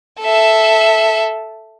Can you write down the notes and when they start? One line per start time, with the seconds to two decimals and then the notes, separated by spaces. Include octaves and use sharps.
0.20 A4 E5